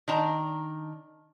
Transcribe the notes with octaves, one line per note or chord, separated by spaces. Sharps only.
D#3 D4 A5 A#5